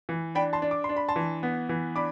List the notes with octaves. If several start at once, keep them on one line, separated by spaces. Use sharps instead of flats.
E3
D4 G5 B5
A5 C6
D4
D6
D4 C6
B5
A5 C6
E3
B3
E3
D4 B5 D6